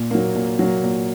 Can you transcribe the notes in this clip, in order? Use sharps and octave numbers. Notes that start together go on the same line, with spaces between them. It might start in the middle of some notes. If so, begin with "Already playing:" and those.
Already playing: A#2
F#3 A#3
A#2
F#3 A#3
A#2